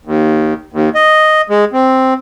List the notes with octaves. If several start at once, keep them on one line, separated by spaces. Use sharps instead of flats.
D#2
D#2
D#5
G#3
C4